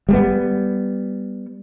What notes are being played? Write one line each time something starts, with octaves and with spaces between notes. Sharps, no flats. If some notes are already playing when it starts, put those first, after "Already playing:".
G3 G#3 B3